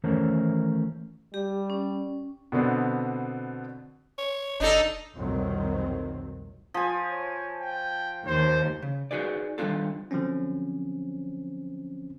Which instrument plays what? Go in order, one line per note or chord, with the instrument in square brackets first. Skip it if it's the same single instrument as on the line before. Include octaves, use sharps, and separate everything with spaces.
[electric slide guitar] D#3 E3 A3 C#4 A#4 C5
[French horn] G3 [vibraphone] G4
[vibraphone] C#4
[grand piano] B2 D3 B3 C4 D4
[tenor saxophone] C#5
[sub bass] F#1 [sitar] D4 D#4 A4 [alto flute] D#5
[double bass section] F1 C2 B2 D#3 F#3 C4
[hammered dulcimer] F3 G#5
[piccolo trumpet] C#5
G5
[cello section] D#2 [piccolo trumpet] C5
[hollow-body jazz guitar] C#3
D#4 F#4 G#4 B4 D5
D#3 G3 A3 D4 F4 A4
[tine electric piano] D3 F3 F#3 C4 C#4